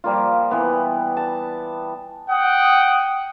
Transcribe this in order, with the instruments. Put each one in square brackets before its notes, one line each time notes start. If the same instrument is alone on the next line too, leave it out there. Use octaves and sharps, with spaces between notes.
[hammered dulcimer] F3 G3 A#3 F4
E3 B3
A5
[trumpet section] F#5 G5 D#6